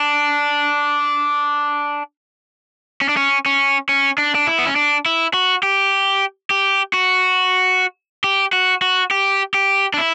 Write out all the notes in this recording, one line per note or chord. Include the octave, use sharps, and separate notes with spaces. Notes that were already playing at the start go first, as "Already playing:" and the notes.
Already playing: D4
C#4
D4
C#4
C#4
C#4
D4
D4
E4
B3
C#4
D4
E4
F#4
G4
G4
F#4
G4
F#4
F#4
G4
G4
D4
E4